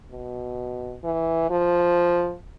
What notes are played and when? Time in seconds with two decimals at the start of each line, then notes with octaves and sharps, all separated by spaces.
0.12 B2
1.04 E3
1.50 F3